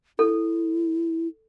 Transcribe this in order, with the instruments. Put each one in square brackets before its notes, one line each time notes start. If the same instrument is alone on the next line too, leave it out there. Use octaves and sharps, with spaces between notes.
[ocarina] E4 [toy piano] A4